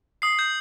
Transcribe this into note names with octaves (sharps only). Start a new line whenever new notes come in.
D#6 C7
G6